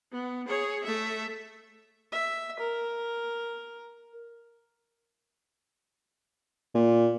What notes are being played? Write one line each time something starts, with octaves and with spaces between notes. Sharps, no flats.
B3
G#4 C#5
A3 E5
E5
A#4
A#2